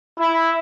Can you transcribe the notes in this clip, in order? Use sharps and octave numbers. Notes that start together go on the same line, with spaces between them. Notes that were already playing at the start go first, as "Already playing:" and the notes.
E4